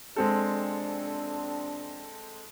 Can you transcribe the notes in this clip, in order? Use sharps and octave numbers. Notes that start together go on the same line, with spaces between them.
F2 C3 G#3 C4 D4 A4